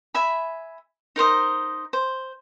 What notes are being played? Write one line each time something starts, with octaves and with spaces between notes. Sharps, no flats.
E5 G#5 B5
D#4 A#4 C5 D#5
C5